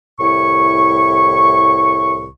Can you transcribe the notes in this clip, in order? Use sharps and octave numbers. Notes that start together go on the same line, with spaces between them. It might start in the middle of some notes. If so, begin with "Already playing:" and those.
C2 A2 E4 C#6